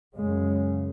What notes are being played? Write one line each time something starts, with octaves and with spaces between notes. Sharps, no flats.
F#2 C#3 G#3